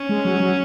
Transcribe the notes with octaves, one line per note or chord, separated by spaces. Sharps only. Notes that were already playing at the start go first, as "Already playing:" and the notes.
Already playing: C#4
G#3
F#3
F#3